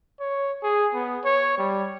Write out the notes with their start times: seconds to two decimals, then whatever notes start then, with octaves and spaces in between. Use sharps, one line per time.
0.20 C#5
0.63 G#4
0.94 B3
1.25 C#5
1.58 G3